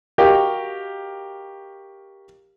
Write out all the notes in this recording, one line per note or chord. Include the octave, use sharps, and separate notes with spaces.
F#4 G4 A#4 D#5 F5 G5